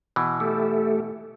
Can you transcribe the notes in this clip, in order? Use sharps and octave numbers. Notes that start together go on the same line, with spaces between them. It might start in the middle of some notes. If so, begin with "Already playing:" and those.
B2 E3
A3 G4 A4